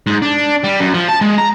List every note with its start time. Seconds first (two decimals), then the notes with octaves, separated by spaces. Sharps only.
0.07 G#2
0.22 D4
0.64 G3
0.80 F#2
0.94 F3
1.08 A5
1.21 G#3
1.38 A#5